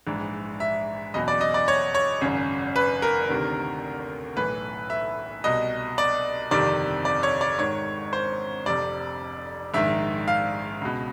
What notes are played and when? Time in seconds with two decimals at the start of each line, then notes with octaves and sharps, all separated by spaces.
0.07 A#1 G#2 E3
0.60 E5
1.14 F#1 E2 B2 D#5
1.28 D5
1.41 D#5
1.54 D5
1.68 C#5
1.95 C#5
2.21 G#1 F#2 C#3
2.76 B4
3.02 A#4
3.29 D2 C3 D#3
4.36 B1 A2 E3 B4
4.90 E5
5.44 C2 B2 D#5
5.98 D5
6.51 G1 F2 C3 D#3 D5
7.05 D5
7.23 C#5
7.41 D5
7.59 G#1 G#2 D#3 C#5
8.13 C5
8.66 F1 F2 C3 D5
9.74 A#1 G#2 D#3 E5
10.28 F5
10.81 C#2 B2